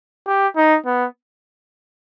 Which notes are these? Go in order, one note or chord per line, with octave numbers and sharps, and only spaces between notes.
G4
D#4
B3